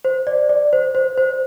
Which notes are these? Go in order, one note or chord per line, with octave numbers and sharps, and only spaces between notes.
C5
D5
D5
C5
C5
C5